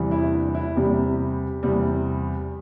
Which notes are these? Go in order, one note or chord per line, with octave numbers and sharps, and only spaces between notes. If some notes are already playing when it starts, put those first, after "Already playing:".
Already playing: E2 C3 E3 G3
E4
D4
E4
E2 C3 G3 G4
E2 C3 G3